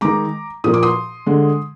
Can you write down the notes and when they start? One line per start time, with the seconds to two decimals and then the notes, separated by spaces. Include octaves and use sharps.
0.01 D#3 G#3 A#5 D6
0.64 A#2 F3 A#3 D#6
0.74 D6
0.83 C6 D#6
1.26 D3 G#3